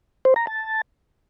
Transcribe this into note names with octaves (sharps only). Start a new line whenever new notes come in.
C5
A#5
A5